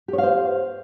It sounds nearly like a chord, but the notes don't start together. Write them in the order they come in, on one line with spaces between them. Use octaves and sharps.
G4 C#5 F5 C5